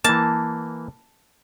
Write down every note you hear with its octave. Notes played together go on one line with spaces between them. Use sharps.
E3 A#3 A5